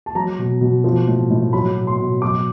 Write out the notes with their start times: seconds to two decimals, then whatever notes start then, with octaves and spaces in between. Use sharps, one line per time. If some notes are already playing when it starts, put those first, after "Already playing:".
0.06 A5
0.15 F#3 A#5
0.39 B2
0.61 B2
0.84 F3
1.08 A2
1.30 A2
1.53 F#3 B5
1.76 B2
1.87 C6
2.00 B2
2.22 F#3 D6